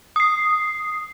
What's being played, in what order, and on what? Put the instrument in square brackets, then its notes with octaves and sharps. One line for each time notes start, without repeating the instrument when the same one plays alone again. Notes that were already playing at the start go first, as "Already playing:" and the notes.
[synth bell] D#6 C7